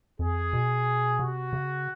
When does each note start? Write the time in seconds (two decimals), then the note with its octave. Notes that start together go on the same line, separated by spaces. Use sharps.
0.19 F2 G#4
0.53 B2
1.19 C3 F#4
1.53 C#3